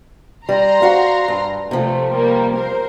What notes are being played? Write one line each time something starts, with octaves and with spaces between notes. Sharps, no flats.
G3 A#5 C6
F#4 C5 F5
G2
C3 F3 A3
G3 A#3
A#4 C5